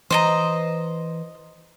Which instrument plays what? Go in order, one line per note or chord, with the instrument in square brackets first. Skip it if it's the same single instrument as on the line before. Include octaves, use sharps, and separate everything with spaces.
[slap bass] E3 [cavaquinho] C5 D#5 A#5